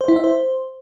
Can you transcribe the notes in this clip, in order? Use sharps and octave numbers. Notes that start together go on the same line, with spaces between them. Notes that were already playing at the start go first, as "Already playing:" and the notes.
C5
E4
E5
C5